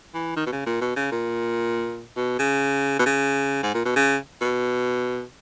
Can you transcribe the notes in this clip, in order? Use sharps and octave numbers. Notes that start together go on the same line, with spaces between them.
E3
D#3
B2
C#3
A#2
B2
C#3
A#2
B2
C#3
B2
C#3
G#2
A#2
B2
C#3
B2